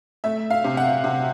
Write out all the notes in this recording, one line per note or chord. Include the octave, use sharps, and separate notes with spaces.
A3 E5
F5
C3
F#5
C3